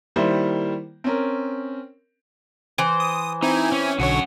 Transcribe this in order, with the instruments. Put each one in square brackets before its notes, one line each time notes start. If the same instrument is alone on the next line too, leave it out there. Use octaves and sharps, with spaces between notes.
[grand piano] D#3 G3 A#3 E4 C5
C4 C#4 A#4
[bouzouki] E3 C5
[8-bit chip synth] D#6
[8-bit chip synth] C4 E4 G#5 [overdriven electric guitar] D#4
[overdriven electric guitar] C#4
[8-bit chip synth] B1 D3 C#5 [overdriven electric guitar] C#4 F#5